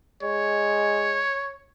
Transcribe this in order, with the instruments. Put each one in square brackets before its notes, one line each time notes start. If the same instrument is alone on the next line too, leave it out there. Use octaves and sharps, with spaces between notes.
[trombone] G#3 [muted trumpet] C#5